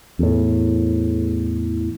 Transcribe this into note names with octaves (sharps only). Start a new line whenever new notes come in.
E2 A2